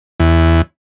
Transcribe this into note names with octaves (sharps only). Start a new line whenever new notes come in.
E2